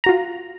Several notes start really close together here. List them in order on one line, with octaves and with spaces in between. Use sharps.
A#5 F#4 F4